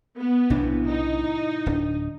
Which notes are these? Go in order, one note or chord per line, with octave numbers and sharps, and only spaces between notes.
B3
B1 A2 C3 E3 D4
D#4
D1 D4